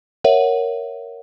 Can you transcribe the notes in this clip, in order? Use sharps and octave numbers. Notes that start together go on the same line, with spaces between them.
A#4 C#5 E5 F#5